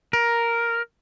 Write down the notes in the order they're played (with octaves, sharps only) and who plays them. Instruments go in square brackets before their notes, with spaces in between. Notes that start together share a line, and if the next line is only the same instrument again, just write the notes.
[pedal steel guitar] A#4